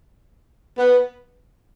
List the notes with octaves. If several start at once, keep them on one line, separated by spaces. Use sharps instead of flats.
B3